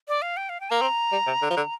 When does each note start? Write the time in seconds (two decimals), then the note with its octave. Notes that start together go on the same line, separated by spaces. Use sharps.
0.08 D5
0.22 F5
0.37 G5
0.49 F5
0.60 G5
0.71 A#3 A#5
0.82 C4
1.12 G3
1.27 C3
1.42 D3
1.51 F3
1.57 D3